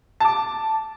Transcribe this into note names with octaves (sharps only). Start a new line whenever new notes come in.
A5 D6